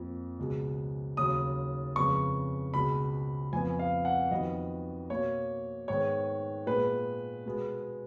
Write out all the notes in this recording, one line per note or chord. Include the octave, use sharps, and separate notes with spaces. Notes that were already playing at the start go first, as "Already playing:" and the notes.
Already playing: F2 F3 A#3
C#2 B2 G#3
D#2 C#3 F#3 D#6
F2 C#3 G#3 B3 C#6
C#2 B2 G#3 B5
F2 F3 B3 G#5
F5
F#5
F2 D#3 F#3 B3 D#5
B2 A#3 C#5
G#2 D#3 G#3 B3 C#5
A#2 G#3 B3 B4
B2 G#3 B3